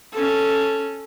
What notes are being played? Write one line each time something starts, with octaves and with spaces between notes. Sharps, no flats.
C#4 A4